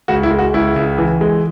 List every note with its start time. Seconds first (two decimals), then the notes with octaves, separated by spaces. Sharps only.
0.08 C#2 F#4
0.23 E4
0.31 G#3
0.39 F#4
0.54 C#2 E4
0.76 C#2
0.98 E3
1.21 G#3